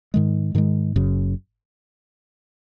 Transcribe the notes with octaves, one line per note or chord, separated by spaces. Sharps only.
G#2 D#3 G#3
G#2 D#3 G#3
F#1 F#2 C#3